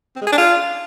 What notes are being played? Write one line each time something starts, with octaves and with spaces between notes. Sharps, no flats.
C4
G#3
G#4
D4
F4